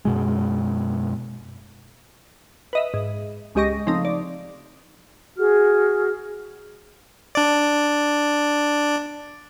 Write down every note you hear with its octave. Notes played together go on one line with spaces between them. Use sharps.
F#2 B2 G#3
B4 D#5 E5
G#2
C#2 G#3 G4 D#5 C#6 A#6
C#3 F3 A3 C4 D#4
D5
F#4 G#4 F6
D4 D5